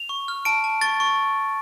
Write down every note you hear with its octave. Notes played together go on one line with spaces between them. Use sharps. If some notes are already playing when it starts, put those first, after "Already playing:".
Already playing: F7
C#6
F6
A5 D7
A5
C#6 A6
C#6